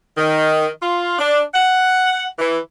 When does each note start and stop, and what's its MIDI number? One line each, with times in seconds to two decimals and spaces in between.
0.17 0.68 51
0.82 1.16 65
1.19 1.42 62
1.54 2.25 78
2.39 2.59 52